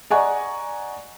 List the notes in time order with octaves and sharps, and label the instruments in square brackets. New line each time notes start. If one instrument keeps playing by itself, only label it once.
[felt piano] D5 D#5 F#5 G#5 A#5 C#6